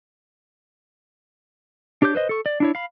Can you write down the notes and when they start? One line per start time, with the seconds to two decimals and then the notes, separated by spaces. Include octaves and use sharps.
2.02 D4 G4 C#5 D6 G6
2.15 B4 C5 D#5
2.29 A4 C#6
2.46 D5
2.60 D4 E4 C#5
2.75 F5 B5